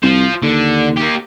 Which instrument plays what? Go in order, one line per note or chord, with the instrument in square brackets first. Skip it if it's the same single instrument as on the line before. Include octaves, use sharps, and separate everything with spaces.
[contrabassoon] C2 [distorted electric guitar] F4 C5
[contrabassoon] D#2 [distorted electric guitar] D3
[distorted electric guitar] A#3 G4